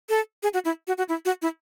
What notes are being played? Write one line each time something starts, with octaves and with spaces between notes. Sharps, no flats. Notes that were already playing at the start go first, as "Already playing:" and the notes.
A4
G#4
F#4
E4
F#4
F#4
E4
F#4
E4